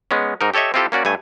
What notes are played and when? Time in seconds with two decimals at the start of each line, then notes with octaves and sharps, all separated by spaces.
0.11 G#3 B3 C#4
0.41 G#2 D#4 A#4
0.54 G4 A4 C#5 D#5 E5
0.74 C4 E4 F4 G4 A4
0.92 A#3 C#4 F#4 D5
1.05 G2 A3 G#5